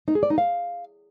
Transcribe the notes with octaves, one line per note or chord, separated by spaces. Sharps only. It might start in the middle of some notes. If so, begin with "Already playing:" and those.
D#4
G#4
D5
D#4
F5